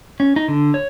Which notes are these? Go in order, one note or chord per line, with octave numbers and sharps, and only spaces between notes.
C#4
D#4
D3
C#5